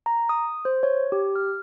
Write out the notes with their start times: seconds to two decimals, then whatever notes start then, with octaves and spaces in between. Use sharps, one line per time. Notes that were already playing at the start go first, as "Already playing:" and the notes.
0.06 A#5
0.29 D#6
0.65 C5
0.83 C#5
1.12 G4
1.36 F6